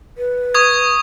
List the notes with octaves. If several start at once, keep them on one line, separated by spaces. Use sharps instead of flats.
B4
C#6 D#6 G#6